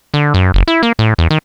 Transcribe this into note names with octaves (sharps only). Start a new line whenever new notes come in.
D3
F#2
F#1
E4
A#3
A2
E2
D#3